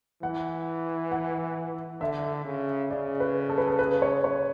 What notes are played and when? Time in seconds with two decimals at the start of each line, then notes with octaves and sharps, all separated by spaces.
0.23 E3 F#5
1.12 F#5
2.01 D3 E5
2.45 C#3
2.90 C#3 D5
3.20 B4
3.49 A4
3.58 B4
3.67 A4
3.79 B4
4.02 C#5
4.24 C#5